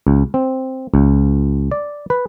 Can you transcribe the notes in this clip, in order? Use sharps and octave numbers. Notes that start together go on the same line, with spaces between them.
C#2
C4
C#2
D5
B4